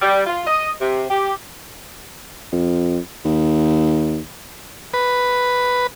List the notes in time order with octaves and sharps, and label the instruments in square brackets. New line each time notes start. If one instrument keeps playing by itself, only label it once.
[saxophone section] G3
F4
D#5
C3
G4
[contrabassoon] F2
D#2
[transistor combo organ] B4